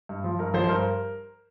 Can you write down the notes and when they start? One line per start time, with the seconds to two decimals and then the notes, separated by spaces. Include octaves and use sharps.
0.09 G2
0.24 F3
0.39 G2 A#4
0.54 F3 C5
0.64 C5
0.68 G2 A#4